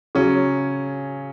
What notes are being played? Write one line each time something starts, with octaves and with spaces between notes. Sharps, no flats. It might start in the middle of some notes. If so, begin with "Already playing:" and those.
C#3 F#3 C#4